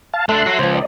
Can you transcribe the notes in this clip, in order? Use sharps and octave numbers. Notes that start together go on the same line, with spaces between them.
F5 A5
A3 D4 A4 E5 C6 F#6
F#4 C#5
C#2 F3 C5
D5 D#5